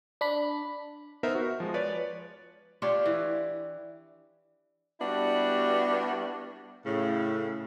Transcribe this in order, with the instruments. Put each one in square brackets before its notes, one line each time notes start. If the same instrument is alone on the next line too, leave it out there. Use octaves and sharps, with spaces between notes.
[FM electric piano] D4 B5
[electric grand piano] B3 D#4 A#4 C5 E5
F#4
F3 G#3
B4 C#5 D5 A6
[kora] D4 F4 G4 C#5
E3
[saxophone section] G3 B3 D4 E4 F#4 G4
A2 C#3